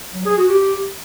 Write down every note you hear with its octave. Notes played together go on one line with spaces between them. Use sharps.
F#3
G#4
F#4
G4